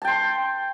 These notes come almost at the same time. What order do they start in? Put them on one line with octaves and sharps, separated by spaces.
A5 G5 C6